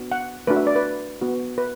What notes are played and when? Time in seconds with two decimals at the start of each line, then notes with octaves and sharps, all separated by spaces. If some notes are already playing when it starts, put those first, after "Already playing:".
Already playing: B3 D4 F#4
0.12 F#5
0.47 A3 D4 F#4 B4
0.56 E5
0.67 D5
0.76 B4
1.21 B3 F#4
1.58 B4